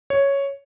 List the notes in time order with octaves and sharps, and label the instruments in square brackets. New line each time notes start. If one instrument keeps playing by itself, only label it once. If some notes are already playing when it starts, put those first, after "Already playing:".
[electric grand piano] C#5